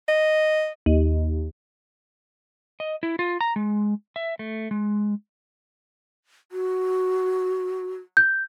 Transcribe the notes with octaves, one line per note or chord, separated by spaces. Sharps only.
D#5
D#2
D#5
E4
F4
A#5
G#3
E5
A3
G#3
F#4
G6